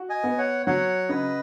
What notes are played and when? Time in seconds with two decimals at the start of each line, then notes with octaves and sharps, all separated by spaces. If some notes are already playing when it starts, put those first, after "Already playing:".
Already playing: F#4
0.09 D#5 G#5
0.24 B3
0.38 C#5 F#5
0.66 F#3 C#5 F#5
1.09 C#3 B4 D#5